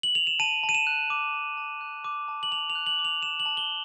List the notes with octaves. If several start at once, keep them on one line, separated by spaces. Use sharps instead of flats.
F#7
F7
E7
A5 D#7
A5
D#7
E7
F#6
D6
A5
A5
F#6
D6
A5
F#7
A5 F7
F7
F#6
F#7
D6
F7
A5 E7
F#7
A5
G7